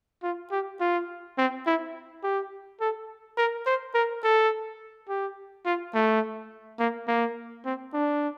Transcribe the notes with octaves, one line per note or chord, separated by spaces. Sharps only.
F4
G4
F4
C4
E4
G4
A4
A#4
C5
A#4
A4
G4
F4
A3
A#3
A#3
C4
D4